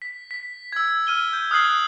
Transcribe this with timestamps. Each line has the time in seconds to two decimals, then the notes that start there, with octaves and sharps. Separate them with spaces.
0.02 B6
0.31 B6
0.72 E6 G#6
1.07 F6 D#7 G7
1.33 G6
1.51 D#6 F6 F#6 G#6 C7 F#7